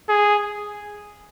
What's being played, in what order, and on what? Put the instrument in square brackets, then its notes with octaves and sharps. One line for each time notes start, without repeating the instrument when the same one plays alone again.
[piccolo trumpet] G#4